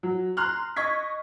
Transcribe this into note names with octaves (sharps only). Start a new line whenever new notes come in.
F#3
A#5 C6 F6 F#6
D#5 C#6 G#6 B6